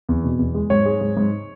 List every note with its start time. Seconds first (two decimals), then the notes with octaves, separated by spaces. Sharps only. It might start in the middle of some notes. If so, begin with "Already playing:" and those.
0.09 E2
0.24 B2
0.39 E2
0.54 G#3
0.70 G#2 C#5
0.86 G#3
1.01 G#2
1.17 G#2